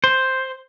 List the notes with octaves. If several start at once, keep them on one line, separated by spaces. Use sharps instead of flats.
C5